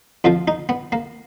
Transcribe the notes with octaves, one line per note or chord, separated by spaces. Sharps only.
F2 F3 F4
D#4
B3
A#3